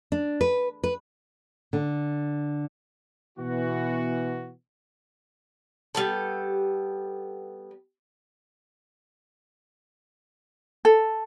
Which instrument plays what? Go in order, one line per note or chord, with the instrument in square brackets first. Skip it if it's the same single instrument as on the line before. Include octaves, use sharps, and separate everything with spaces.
[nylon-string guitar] D4
B4
B4
D3
[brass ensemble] B2 E3 B3 F#4
[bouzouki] G3 B3 A4
[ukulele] A4